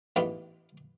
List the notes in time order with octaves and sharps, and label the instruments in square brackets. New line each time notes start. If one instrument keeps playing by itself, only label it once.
[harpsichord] A1 G#2 E3 B3 D4 F4